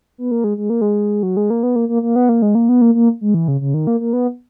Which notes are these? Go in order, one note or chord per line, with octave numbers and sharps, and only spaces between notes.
B3
A#3
G#3
G#3
A#3
G#3
F#3
G#3
A#3
B3
A#3
A#3
A#3
B3
A#3
G#3
A#3
B3
A#3
A#3
G#3
E3
C#3
C#3
D#3
A#3
A#3
B3